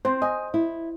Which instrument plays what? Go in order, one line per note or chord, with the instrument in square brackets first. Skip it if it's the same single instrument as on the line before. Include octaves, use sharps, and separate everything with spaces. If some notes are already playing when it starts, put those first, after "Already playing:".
[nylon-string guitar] C4 [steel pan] C5
[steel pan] D#5 [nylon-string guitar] G#5
[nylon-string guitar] E4